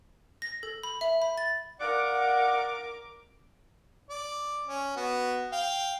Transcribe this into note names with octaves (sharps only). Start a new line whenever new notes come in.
A#6
A4
B5
E5
B5
A6
A#4 D5 F5 F#5 D6
D5
C#4
B3 F#4
F5 G5